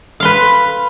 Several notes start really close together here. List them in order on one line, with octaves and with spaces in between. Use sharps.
F5 C6 B4